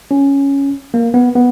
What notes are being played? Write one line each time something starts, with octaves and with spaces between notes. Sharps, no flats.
C#4
A#3
B3
B3